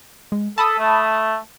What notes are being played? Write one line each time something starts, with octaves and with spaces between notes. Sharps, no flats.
G#3
A4 A5 B5 D#6
A3